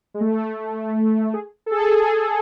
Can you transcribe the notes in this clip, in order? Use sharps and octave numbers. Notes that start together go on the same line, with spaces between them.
G#3
A3
G#4
A4
G#4
G#4